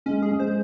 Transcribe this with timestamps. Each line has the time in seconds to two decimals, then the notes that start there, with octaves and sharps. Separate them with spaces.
0.06 G#3 C#4
0.22 G#4
0.31 G#3
0.40 C5